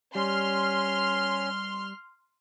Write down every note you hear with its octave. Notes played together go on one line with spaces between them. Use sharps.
G3 C#4 C6 F6